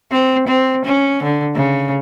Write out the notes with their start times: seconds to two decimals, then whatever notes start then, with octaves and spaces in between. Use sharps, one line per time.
0.11 C4
0.48 C4
0.85 C#4
1.23 D3
1.55 C#3